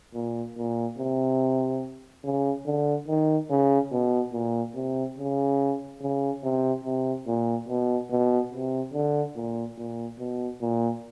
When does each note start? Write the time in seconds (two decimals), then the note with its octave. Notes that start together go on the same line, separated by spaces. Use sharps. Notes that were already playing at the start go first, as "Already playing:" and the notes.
0.14 A#2
0.57 A#2
0.98 C3
2.24 C#3
2.66 D3
3.08 D#3
3.50 C#3
3.92 B2
4.33 A#2
4.75 C3
5.18 C#3
6.01 C#3
6.43 C3
6.84 C3
7.27 A#2
7.68 B2
8.10 B2
8.52 C3
8.93 D3
9.35 A#2
9.77 A#2
10.19 B2
10.61 A#2